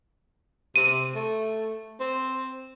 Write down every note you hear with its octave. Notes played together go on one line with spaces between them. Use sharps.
C3 D#7
A3
C4